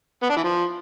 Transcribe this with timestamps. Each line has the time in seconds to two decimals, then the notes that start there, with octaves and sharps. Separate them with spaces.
0.22 B3
0.29 D4
0.37 E3
0.44 F3